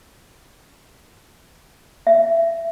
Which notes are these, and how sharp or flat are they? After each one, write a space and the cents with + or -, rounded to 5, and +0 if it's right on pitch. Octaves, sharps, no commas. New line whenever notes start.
E5 +20